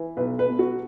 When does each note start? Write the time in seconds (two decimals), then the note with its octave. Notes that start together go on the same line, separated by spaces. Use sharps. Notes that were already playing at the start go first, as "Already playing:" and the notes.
Already playing: E3
0.17 B1 B4
0.39 B4
0.48 B2
0.59 F#4